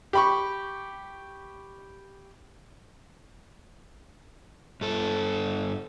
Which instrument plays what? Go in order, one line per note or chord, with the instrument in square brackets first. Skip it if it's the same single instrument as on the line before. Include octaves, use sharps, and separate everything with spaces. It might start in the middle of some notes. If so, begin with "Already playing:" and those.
[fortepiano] G4 B5 C#6
[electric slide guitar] G2 A4